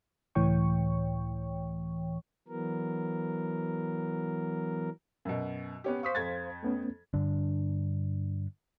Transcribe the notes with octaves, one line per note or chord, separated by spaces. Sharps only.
C#2 A2 E3 C#5 G5 C#6
E3 F#3 B3 A#4
F#2 B2
B3 C#4 G4
C5 F5 C#6 D#6 B6
F2 G#6 A6
A3 B3 C#4
G2 D3 D4